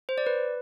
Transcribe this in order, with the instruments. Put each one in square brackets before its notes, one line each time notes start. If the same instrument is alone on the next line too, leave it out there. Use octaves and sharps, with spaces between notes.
[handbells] C5
D5
B4